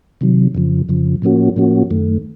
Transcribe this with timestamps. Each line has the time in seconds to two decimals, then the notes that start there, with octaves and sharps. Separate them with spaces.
0.21 C3 D#3 F#3
0.55 F2 C#3 F3
0.89 F2 C#3 F3
1.22 A2 F3 A#3 C#4 F#4
1.56 A2 F3 A#3 C#4 F#4
1.91 F#2 D#3 A3